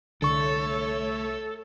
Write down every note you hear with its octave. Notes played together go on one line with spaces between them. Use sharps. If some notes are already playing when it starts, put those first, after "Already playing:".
C2 D3 A3 A4 C#5 C#6